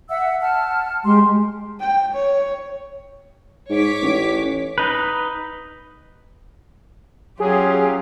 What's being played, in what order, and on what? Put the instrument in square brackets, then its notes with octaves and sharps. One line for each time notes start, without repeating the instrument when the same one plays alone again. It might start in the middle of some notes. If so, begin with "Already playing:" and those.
[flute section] E5 F#5 E6
F#5 A5 F6
[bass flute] G#3 [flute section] G4 C6
[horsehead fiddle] G5
C#5
[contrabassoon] G#2 [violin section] C#5 D6 B6
[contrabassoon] A1
[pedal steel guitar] D#4 B4
[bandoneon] F#3 [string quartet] C#4 F4 G4 [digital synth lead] G#4